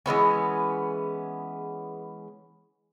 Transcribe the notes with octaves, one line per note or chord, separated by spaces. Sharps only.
E3 G#3 B3 C#4